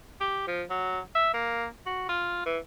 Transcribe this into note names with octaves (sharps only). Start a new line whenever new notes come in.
G4
F3
F#3
E5
A#3
F#4
F4
E3